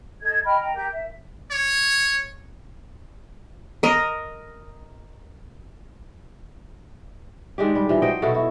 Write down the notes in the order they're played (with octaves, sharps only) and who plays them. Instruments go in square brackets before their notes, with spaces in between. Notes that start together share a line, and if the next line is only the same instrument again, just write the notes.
[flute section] A4 D#5 G#6
D#5 G5 B5 F6
G5 A#5
G4 A#4 G5 G6
E5
[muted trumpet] C#5
[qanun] A#4 D#5
[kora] D#3 G#3 D4 G4
G3
E3 F3 G3
F#3 C5 D#5 G5
B2 E4 F#4 A4
E4